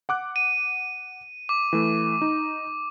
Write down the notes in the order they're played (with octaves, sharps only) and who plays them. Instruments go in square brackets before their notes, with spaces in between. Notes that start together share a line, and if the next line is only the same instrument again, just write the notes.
[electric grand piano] F#5 D6 F#6
[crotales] D#7
D6
[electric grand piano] E3 A3
D#4